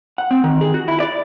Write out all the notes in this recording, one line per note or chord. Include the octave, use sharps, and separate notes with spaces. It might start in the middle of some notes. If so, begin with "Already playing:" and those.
F#5
C4
D#3
G#4
F#4
E4
D5